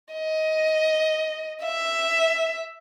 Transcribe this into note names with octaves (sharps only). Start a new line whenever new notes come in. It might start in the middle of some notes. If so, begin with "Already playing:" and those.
D#5
E5